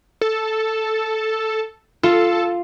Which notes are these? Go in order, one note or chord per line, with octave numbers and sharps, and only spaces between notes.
A4
F4 A4